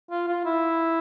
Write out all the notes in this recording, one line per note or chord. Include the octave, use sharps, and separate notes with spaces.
F4
F4
E4